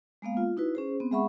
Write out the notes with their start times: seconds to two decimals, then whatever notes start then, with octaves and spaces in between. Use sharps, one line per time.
0.22 G#3 A#3 B3 F5
0.37 F4
0.57 D#4 E4 F#4 B4
0.75 C#4 G#4 C5
1.00 B3 C4
1.11 G#3 G#4 E5 F#5 B5 C#6